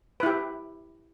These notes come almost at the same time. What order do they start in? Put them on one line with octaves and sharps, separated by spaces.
B4 E4 G4